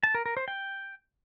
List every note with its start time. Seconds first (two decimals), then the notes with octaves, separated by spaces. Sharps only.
0.03 A5
0.15 A#4
0.26 A#4
0.37 C5
0.48 G5